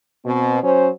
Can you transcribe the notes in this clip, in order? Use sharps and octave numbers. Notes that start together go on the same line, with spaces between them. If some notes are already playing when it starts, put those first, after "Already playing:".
B2 C4
F#3 C#4 C5